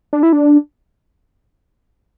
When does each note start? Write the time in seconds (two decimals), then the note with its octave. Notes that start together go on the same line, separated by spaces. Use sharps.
0.13 D4
0.23 E4
0.33 D4